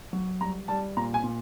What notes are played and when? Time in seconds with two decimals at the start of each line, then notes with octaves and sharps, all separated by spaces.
0.13 F#3
0.41 G3 A#5
0.68 G3 A5
0.97 A#2 A#5
1.14 G#5
1.24 A#2